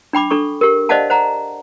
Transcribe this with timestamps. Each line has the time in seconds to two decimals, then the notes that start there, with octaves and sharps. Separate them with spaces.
0.13 D4 G5 B5 D6
0.30 D4 A4 C#6
0.61 G4 A#4
0.89 C5 D5 D#5 F5 F#5 A5
1.10 C5 F#5 A#5